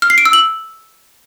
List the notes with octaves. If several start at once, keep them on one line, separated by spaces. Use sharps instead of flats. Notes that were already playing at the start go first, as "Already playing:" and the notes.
F6
C7
D7
E6
F#7